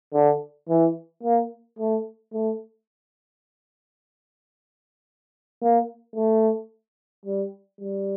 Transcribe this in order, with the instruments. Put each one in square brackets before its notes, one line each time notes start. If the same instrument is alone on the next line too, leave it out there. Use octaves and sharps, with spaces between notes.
[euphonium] D3
E3
A#3
A3
A3
A#3
A3
G3
G3